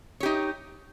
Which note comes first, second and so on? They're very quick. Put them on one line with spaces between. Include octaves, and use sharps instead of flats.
C#5 G4 D#4